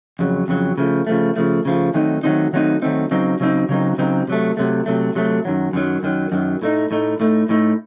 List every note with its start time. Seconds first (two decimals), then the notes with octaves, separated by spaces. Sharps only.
0.19 F2 C#3 F#3
0.48 F2 C#3 F#3
0.78 C#3 F3 A3
1.07 C#3 F3 A3
1.36 C#3 F3 A3
1.65 C#3 F3 A3
1.94 D#3 F#3 A3 C4 D#4
2.23 D#3 F#3 A3 C4 D#4
2.53 D#3 F#3 A3 C4 D#4
2.82 D#3 F#3 A3 C4 D#4
3.11 C#3 F#3 C4 D#4
3.40 C#3 F#3 C4 D#4
3.69 C#3 F#3 C4 D#4
3.98 C#3 F#3 C4 D#4
4.28 C3 F#3 A3
4.57 C3 F#3 A3
4.86 C3 F#3 A3
5.15 C3 F#3 A3
5.45 F#2 D#3 F#3
5.73 F#2 D#3 F#3
6.03 F#2 D#3 F#3
6.32 F#2 D#3 F#3
6.62 A2 A3 D#4
6.91 A2 A3 D#4
7.20 A2 A3 D#4
7.49 A2 A3 D#4